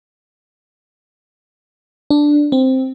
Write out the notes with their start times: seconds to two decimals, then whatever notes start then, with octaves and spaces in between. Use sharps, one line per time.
2.10 D4
2.52 C4